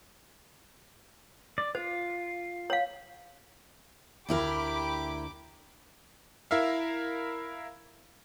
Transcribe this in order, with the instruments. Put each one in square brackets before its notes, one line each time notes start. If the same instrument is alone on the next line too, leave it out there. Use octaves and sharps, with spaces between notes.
[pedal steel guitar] D5
[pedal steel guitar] F4 [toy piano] C5
[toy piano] C#5 F5
[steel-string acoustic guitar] D2 E4 A#4 [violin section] G4 B5 D6
[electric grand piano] E4 A#4 E5 F5